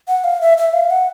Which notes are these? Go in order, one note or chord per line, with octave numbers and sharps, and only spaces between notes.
F#5
F5
E5
E5
F5
F#5